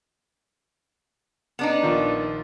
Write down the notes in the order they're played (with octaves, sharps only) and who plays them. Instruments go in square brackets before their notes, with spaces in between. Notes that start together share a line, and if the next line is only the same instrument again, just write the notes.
[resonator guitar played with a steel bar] B3 D4 D#4
[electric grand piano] A#1 D#3 F4